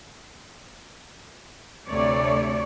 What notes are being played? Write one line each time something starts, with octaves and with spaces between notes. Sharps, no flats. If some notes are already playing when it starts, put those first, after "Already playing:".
D2 C3 A3 C#5 D5